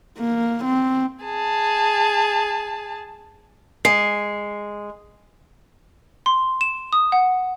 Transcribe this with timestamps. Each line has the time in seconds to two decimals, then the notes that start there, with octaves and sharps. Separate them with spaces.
0.19 A#3
0.65 C4
1.25 G#4 A5
3.85 G#3 C7
6.26 C6
6.61 E7
6.93 D#6
7.12 F#5